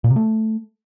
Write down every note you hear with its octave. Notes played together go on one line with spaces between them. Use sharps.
A#2
C3
A3